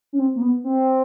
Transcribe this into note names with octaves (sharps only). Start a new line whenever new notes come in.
C#4
C4
A#3
B3
C4